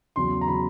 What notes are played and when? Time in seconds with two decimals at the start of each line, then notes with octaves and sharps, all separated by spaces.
0.16 E2 C#3 F#3 C6
0.41 A#5
0.47 C#3 F#3 B5